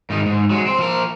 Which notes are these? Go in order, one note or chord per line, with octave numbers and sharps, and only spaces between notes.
G#2 D#3
G#2
F#3 G#3
C4
F3 A#4